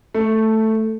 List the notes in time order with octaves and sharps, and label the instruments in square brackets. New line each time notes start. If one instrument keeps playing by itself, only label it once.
[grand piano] A3